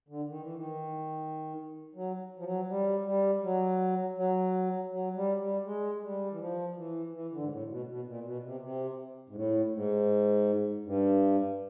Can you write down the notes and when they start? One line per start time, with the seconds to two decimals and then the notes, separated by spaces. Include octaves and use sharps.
0.08 D3
0.28 D#3
0.42 E3
0.55 D#3
1.95 F#3
2.39 F3
2.44 F#3
2.69 G3
3.05 G3
3.43 F#3
4.17 F#3
4.92 F#3
5.16 G3
5.40 G3
5.65 G#3
5.96 G#3
6.03 G3
6.31 E3
6.39 F3
6.76 E3
7.14 E3
7.32 D3
7.41 G#2
7.50 A2
7.69 B2
7.88 B2
8.06 A#2
8.25 B2
8.43 C3
8.61 C3
9.29 G#2
9.35 A2
9.73 G#2
10.85 G2